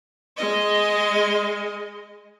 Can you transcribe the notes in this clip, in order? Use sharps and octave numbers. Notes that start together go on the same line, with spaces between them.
G#3 D#5